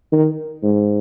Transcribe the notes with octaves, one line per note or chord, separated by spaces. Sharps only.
D#3
G#2